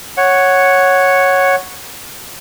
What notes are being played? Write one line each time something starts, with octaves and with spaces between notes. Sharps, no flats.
C#5 F#5